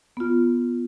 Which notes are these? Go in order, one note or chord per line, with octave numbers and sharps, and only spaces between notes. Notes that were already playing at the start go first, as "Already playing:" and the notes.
B3 F4